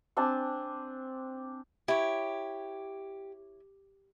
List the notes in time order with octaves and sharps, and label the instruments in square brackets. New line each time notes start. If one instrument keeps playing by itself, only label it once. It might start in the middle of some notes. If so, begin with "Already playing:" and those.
[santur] C4 D4 G#5 A5
[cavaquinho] E4 C#5 [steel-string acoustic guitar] G4